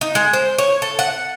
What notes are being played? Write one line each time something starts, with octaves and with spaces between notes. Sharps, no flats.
D#4
G#3
C5
C#5
A4
F#5